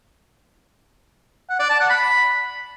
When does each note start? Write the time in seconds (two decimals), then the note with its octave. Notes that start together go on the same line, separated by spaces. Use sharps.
1.49 F#5
1.60 D5
1.70 A5
1.80 F#5
1.90 B5